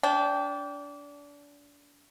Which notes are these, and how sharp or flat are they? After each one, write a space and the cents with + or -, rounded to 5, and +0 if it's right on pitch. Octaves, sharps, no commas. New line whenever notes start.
D4 -30 G5 +0